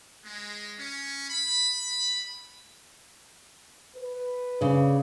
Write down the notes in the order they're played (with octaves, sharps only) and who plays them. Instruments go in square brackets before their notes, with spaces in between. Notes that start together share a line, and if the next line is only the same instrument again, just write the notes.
[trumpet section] G#3
C#4
B5
[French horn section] B4
[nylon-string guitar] C#3 D5